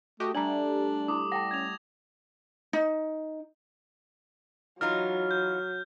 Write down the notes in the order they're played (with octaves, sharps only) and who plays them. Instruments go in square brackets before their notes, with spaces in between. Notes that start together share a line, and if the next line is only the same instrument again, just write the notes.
[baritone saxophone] A3 [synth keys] F#4 G4 D#5
[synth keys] G3 A3 [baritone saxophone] D4 [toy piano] D5 G#5 A#5 [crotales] F#7
[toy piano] E4 G4 [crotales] D6 D#6
[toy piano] F#5 G5 A5 [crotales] A#6
[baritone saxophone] C#4 [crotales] G#6 F7
[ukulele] D#4
[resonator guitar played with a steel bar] E3 D#4 F4 [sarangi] F#3 [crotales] F6
[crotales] G6